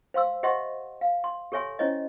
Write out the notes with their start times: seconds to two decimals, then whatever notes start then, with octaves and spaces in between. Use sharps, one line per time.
0.14 C5 F5 C6 E6
0.43 G4 C5 D#5 E5 F#5 C6
1.01 F5
1.24 C6
1.52 G4 A4 C#5 E5 G#5 C6
1.79 C#4 E4 C5 C#5 D#5